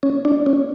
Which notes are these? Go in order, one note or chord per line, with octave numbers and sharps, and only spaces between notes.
C#4
D4
C#4